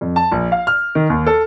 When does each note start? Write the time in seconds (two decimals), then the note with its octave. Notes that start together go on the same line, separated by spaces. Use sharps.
0.01 F2
0.16 A5
0.32 A#1
0.52 F5
0.67 F6
0.95 D#3
1.09 D#2
1.26 A4